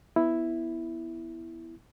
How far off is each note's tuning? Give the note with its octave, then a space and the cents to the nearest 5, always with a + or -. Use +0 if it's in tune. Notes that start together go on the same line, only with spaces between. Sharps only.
B3 +0 E4 +0